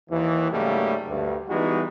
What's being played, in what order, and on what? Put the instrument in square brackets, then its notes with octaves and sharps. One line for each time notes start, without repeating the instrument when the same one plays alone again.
[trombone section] D#2 E3
G#2 C#3 F#3 G3 A3 A#3
D2 G2
E3 G3 G#3 B3 D#4 F#4